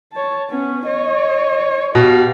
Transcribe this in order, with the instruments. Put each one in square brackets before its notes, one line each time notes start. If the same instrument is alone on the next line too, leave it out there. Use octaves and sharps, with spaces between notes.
[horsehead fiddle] C#5 A5
B3 C#4
C#5 D#5
[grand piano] B2 [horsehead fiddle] G4 F5